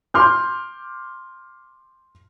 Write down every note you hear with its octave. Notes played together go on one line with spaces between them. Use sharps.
C6 D6 F6 G6